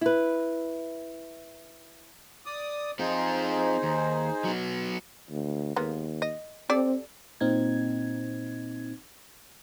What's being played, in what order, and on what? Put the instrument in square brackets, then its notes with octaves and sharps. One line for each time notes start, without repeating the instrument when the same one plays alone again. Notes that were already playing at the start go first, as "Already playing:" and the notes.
[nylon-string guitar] E4 B4
[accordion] D5 D#6
[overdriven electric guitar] C4 F4 [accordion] D#4 G#4 C5
[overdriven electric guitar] D#2
F#3 B3
[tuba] D2
[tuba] D#2 [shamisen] G#3 A#3 B3
[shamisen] D#5
[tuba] C4 [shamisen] G4 A4 D5
[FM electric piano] A#2 C4 D#4 G#6